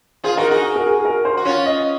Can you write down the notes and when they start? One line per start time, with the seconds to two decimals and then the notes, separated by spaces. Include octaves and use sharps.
0.24 F4 G#4 C5
0.37 D#4 F#4 A#4
0.50 D#4 F#4 G#4
0.64 G#4
0.76 A#4
0.86 G#4
0.99 G#4
1.05 A#4
1.25 C5
1.37 F#4
1.45 C#4 F4 C#5
1.66 D#5